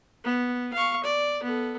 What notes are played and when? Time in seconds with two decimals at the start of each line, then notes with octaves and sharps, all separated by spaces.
0.25 B3
0.74 F5 C#6
1.04 D5
1.43 B3 A4